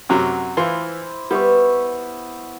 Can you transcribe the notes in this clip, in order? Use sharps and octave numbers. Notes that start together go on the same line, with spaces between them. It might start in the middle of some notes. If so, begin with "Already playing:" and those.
F#2 C3 F#3 D6
E3 E4 F4 C5 C6
G3 B3 E5 C#6